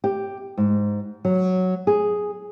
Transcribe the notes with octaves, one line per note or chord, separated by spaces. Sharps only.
G4
G#2
F#3
G#4